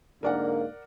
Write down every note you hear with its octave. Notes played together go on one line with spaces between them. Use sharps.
G#2 D3 A#3 A#4 D5 F#5